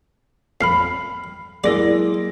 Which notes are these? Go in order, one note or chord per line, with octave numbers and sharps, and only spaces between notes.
F2 B5 F6 C7
F#3 G#3 A#3 E4 D5 A#6